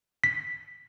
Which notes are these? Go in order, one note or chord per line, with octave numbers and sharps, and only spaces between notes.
B6